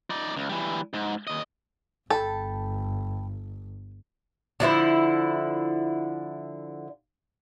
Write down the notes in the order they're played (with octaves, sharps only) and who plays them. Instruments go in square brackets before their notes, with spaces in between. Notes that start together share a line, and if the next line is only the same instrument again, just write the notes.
[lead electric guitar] D#4 D5
C#2
E3 G3
G#2
D#2 D#5
[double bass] G1 [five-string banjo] A4 [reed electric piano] G5 A5 B5
[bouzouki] D3 F3 E4 C5